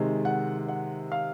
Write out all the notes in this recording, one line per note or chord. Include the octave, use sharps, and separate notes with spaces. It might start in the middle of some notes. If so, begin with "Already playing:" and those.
Already playing: C3 D#3 G#3
F#5
F#5
F5